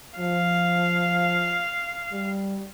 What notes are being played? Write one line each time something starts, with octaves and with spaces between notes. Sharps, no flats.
F3 F5
G3